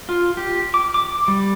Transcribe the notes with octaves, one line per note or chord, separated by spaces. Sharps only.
F4
G4
D6
D6
G3